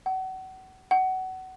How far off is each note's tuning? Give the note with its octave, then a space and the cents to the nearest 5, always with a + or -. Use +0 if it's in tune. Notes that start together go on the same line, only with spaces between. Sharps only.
F#5 +30
F#5 +20